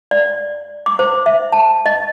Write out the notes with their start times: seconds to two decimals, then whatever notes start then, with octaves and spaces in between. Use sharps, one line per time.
0.11 D5
0.86 D6
0.99 C5
1.26 E5
1.52 A5
1.86 D#5